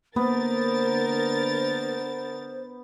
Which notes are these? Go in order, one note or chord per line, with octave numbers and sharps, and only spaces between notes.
D3 A#3 B3 A#4 C5 A6